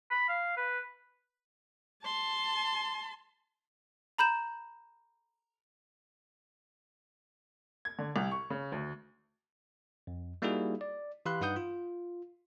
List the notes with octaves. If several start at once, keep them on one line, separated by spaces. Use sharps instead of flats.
B5
F5
B4
A5 C6
A#5 B5 G6 E7
G#6
D3
C2
C#6
C#3
D2
F2
G3 A#3 D#4 E4 F#4 G#4
D5
E3 G4 F5 B5 C6 F#6
G2 D#4 B4 F#5 D#6 G6
F4